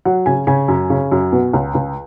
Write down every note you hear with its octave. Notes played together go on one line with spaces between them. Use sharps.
F#3 F#5
C#3 G#5
C#3 G#5
F#2
C#3
F#2
B2
C#2
C#2